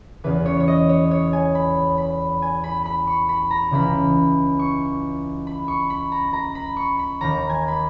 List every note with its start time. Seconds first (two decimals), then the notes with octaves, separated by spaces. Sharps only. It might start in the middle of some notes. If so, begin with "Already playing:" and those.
0.24 E2 C#3 E3 B4
0.46 C#5
0.60 C#5
0.68 D#5
0.89 C#5
1.11 C#5
1.33 G#5
1.55 B5
1.98 B5
2.42 G#5
2.64 B5
2.86 B5
3.07 C#6
3.29 B5
3.51 A#5
3.71 C#2 C#3 E3 B5
4.59 C#6
5.47 B5
5.68 C#6
5.90 B5
6.12 A#5
6.33 A#5
6.55 B5
6.77 C#6
6.99 B5
7.21 D#2 D#3 A#5
7.49 G#5
7.68 B5